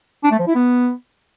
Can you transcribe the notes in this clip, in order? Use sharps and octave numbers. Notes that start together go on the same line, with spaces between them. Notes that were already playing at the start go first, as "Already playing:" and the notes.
D4
A3
F3
E4
B3